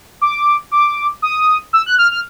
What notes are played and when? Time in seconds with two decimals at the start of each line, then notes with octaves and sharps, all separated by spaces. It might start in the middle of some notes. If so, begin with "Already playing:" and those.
0.21 D6
0.71 D6
1.22 D#6
1.73 E6
1.86 F#6
1.99 F6
2.11 F6